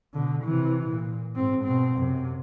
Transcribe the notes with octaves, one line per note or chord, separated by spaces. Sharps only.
B2 D3
C3 E3
A#2
G#2 C4
B2 C4
F#2 C3